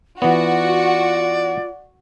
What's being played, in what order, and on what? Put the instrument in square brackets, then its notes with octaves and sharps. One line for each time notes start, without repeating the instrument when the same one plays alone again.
[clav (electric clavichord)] E3 B3 [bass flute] F4 [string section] F#4 [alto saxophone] D5